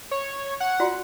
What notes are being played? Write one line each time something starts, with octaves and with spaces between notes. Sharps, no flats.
C#5
F#5
F4 F#4 D5